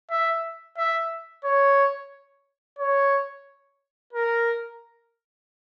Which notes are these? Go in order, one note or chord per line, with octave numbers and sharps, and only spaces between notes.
E5
E5
C#5
C#5
A#4